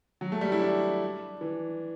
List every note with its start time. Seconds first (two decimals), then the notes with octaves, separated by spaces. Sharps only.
0.21 F#3
0.32 A3
0.41 G3
0.52 E4
0.61 D4
1.41 E3